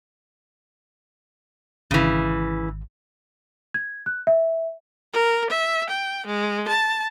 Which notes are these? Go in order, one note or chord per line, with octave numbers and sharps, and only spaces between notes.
G#1 C#3 E3
G#6
F#6
E5
A#4
E5
G5
G#3
A5